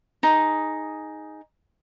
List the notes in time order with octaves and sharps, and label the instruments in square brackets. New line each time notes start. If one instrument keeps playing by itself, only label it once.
[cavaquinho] D#4 G#4